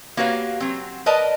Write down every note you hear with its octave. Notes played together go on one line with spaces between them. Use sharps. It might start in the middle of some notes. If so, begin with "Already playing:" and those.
A#3 F#4 G4 B4 C#5 F5
F#3 C4
A#4 B4 D5 D#5 A5